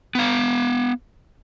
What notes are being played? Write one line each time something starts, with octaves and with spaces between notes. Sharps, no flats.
B3 F5